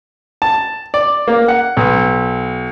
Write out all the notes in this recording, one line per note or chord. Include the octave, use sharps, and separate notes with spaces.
A5
D5
A#3
F#5
B1